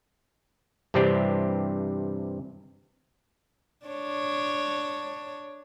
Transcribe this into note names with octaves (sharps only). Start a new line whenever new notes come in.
G2 C3 E3 C4 D4 G4
D4 C#5